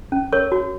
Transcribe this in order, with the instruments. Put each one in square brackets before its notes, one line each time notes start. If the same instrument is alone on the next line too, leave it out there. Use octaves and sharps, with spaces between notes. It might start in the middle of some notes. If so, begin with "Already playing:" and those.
[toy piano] C#4
A#4 C#5 C#6
F#4